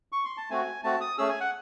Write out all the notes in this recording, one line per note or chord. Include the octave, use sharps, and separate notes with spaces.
C#6
C6
A5
A3 C4 F#4 G#5
A3 C4 F#4 A5
D#6
A3 C#4 G#4 E6
G#5
F#5